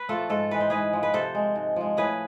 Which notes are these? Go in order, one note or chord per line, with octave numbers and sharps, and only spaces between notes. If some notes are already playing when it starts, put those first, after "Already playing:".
Already playing: B4
F3 A3 F4 A4
G#2 F4 A4
E3 G#3 B4
C5
G#2 G#4 B4
F3 G#3
B4
C3 A4 C5
G#3
G#2
F3 G#3
A2 G#4 B4